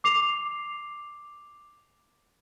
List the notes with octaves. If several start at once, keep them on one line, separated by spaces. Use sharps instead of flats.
D6 C7 F7